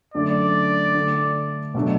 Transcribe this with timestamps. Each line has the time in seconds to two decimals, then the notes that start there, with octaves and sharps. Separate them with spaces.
0.14 F#2 D3 A3 D4 D5
0.94 D3 A3 D4
1.74 B2 F#3 A3 D4